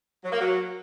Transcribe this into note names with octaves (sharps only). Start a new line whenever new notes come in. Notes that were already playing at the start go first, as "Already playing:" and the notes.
F#3
A#3
F#3